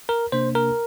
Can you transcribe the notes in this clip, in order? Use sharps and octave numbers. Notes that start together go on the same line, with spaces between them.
A#4
C3 A#3 D4 C5
A#4